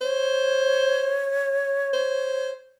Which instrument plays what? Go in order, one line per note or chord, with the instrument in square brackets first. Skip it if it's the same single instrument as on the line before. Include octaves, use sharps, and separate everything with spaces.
[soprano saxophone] C5 [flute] C#5
[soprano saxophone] C5